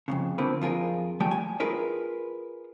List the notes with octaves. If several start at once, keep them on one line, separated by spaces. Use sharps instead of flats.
F2 A2 C#3
D3 F3 A#3 C4 B4
F2 F4 G#4 A#4
D#2 F3 G3 A3 G5 G#5
G#5
F4 G#4 A#4 B4 D#5